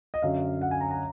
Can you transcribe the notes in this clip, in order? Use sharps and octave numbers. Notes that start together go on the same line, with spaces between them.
D#5
F#2 D3 F#3 F5
F#5
G#5
A#5
A#5